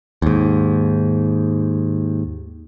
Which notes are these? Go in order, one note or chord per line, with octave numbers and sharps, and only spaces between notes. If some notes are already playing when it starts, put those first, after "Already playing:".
D#2 G#2